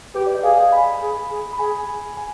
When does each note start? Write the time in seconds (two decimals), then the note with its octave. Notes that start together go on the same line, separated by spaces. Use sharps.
0.15 G4 B4
0.27 D5
0.34 D#5
0.43 G#4 F5
0.58 G#5
0.72 B5
1.01 G#4
1.31 G#4
1.53 B5
1.59 G#4 G#5
2.17 G#5